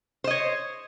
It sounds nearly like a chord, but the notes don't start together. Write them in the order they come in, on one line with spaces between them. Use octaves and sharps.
C5 D#5 C#5